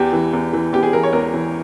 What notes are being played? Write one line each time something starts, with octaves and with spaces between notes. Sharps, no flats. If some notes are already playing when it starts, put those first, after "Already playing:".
Already playing: E2 G4
E3
E2
E3
E2 G4
G#4
E3 A#4
C#5
E2 A#4
E3